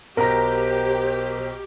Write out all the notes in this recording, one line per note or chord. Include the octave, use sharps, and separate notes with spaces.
B1 G4 A#4 C5 A#5 A#6